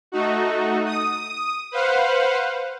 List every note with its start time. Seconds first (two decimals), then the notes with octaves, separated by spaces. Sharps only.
0.12 A3 D#4 F#4
0.86 D#6
1.71 B4 C5 F5 F#5